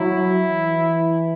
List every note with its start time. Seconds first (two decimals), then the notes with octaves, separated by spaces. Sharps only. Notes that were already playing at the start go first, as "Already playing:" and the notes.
Already playing: F#3 E4
0.49 E3